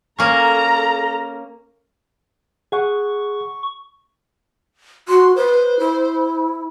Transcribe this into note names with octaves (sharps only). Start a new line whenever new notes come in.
A#3 C#4 A4 A#5
G#4 F#5 C#6
F#4 C6
B4 C5
E4